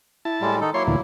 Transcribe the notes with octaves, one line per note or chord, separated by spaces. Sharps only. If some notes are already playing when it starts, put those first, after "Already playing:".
E4 A5
A2 G3 G#3
D#3 D#4 A4
F#3 A#3 E4 C#5 C6
D2 A#2 E3